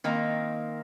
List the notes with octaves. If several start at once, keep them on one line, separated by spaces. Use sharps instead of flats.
D#3 A#3 C4 D#4